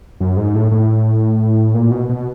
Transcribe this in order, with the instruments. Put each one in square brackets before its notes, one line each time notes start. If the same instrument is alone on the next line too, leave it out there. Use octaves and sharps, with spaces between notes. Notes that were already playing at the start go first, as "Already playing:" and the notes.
[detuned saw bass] F#2
G#2
A2
A2
A#2
B2
B2